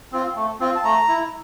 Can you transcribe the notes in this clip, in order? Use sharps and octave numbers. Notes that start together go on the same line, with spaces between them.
C4 F4
A3
C4 F4
A5
A3 A#5
E4